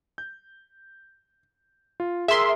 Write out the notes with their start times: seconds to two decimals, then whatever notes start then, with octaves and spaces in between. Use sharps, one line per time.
0.18 G6
2.00 F4
2.28 G#4 A#4 E5 C6